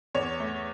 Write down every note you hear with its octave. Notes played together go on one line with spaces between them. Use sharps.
E2 C#5
A3